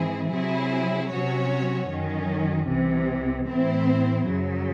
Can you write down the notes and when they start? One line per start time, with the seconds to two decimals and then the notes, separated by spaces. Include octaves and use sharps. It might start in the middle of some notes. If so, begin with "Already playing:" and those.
Already playing: G#2 E3 C4 E4 G#4
0.31 C3 F#3 C4 E4 G#4
1.10 C3 F#3 C#4 F#4 C#5
1.89 F#2 D#3 F#3 C#4
2.68 C2 C3 E3
3.47 A2 E3 C4 E4 C5
4.25 F#2 C#3 F#3